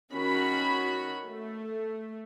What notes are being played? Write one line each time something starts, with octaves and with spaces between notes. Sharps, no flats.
D#3 C#4 F#4 B5
A3